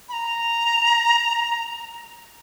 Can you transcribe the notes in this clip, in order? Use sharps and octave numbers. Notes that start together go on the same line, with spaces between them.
B5
A#5